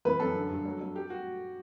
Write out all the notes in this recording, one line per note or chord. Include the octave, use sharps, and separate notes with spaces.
E3 B4
F#2 A4
D3
G2
F#3
F#3
G3 G4
F#4